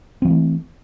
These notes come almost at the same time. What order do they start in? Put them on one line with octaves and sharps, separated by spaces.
C4 F3 E3 A3